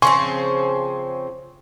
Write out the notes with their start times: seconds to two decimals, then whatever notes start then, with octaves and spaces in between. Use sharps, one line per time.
0.02 C#3 F3 C4 G#5 C6 C#6